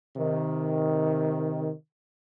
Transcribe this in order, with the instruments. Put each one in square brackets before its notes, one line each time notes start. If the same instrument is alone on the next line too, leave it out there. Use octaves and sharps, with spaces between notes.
[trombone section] C3 D#3